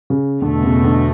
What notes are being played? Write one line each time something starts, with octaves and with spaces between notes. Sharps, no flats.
C#3
E2 B2 D3 A3
C#3
D3